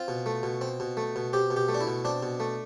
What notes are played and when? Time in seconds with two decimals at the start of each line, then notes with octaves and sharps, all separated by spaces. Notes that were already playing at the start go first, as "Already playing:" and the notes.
Already playing: C4 F4
0.08 B2
0.26 A3
0.43 B2
0.61 C4
0.80 B2
0.97 A3
1.16 B2
1.33 C4 G4
1.51 B2
1.56 G4
1.68 A3
1.75 D4
1.81 E4
1.87 B2
2.05 C4 D4
2.23 B2
2.40 A3